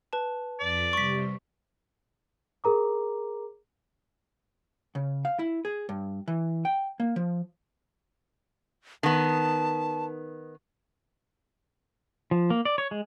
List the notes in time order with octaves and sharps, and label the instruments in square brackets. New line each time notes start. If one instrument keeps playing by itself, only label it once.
[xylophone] B4 A5
[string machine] F2 B6 [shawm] D5
[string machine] C3 G3 [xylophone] C#6 B6
[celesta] G#4 A#4 A#5 D6
[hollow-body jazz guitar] C#3
F5
E4
G#4
G2
E3
G5
A#3
F3
[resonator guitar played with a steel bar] D#3 B3 [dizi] A5
[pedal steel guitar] F3
A#3
D5
C#5
G#3